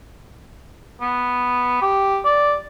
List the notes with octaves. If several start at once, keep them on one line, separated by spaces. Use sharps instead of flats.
B3
G4
D5